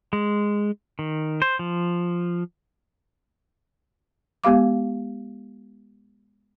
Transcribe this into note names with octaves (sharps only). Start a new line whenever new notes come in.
G#3
D#3
C5
F3
G#3 B3 G4 F5 D6